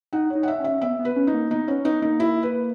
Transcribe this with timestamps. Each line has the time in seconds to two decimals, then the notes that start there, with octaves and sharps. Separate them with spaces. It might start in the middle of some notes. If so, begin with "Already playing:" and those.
0.13 D#4 F#5
0.30 C#5
0.35 D#4
0.43 F#5
0.48 E5
0.59 C#4
0.64 E5
0.82 B3 E5
0.99 B3
1.05 B4
1.16 C#4
1.27 D#4
1.34 A#3
1.51 B3 D#4
1.67 B3 C#4
1.85 B3 D#4
2.02 A#3 D#4
2.20 E4
2.43 B4